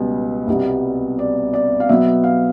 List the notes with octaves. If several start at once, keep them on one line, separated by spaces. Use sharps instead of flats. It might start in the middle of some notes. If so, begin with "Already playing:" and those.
Already playing: C#2 B2 G3 B3
C2 B2 G3 B3
D5
D5
F5
B2 F#3 B3 E5
F5